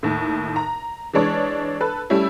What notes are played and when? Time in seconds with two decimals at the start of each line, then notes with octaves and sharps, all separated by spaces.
0.03 D#2 A2
0.56 A#5
1.13 E3 G#3 D4 C#5
1.80 A4 B4
2.10 G3 A3 C#4 E4